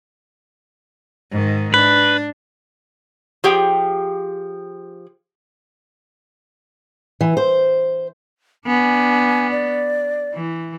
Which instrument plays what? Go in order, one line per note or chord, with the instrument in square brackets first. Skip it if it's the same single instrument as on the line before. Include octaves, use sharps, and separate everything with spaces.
[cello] G#2 D#3
[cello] D4 [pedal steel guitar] B4
[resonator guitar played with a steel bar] F3 G4 G#4 G5
[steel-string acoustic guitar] E3
C5
[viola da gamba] B3 D4 [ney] G#5
[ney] D5
[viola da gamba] E3